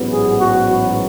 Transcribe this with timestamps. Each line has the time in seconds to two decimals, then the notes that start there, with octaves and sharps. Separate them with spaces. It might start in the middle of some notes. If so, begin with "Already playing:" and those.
Already playing: A1 G#2 F#3 B3
0.11 G#4
0.40 F#4
0.69 F#4